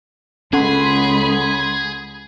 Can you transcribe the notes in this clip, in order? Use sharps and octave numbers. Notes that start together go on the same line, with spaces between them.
C#2 C#4 G#4 A4 F#5 B5 C6